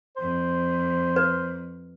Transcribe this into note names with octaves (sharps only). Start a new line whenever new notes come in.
F2 C5
B4